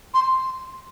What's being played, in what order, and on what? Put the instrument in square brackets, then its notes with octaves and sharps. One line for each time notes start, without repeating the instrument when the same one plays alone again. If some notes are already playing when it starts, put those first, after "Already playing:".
[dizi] C6